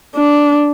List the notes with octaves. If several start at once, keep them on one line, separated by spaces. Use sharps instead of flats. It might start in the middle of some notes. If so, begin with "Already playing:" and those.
D4